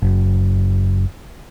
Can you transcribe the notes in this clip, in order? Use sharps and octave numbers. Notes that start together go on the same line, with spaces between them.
F#1